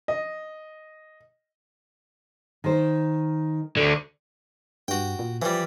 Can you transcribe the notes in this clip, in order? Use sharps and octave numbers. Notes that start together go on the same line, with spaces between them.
D#5
D#3 C5
D2 D3
G2 F#4 G5
A#2
E3 F3 G3